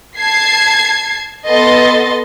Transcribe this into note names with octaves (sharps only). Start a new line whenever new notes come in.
A5 G#6 C7
B3 A4 D#5 C6 A6